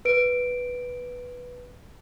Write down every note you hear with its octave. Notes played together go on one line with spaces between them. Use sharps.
B4 D7